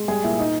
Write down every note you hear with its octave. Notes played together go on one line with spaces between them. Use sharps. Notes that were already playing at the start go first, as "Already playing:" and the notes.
Already playing: G#3
G3 G#4
A#2 E4
D#4